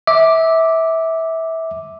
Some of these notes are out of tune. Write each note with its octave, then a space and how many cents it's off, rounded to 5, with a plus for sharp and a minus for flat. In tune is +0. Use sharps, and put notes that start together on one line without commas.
E5 -20 D6 +0